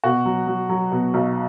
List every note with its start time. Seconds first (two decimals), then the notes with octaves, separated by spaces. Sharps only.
0.04 B2 F#4
0.25 F#3
0.47 F#3
0.69 F#3
0.92 B2
1.14 B1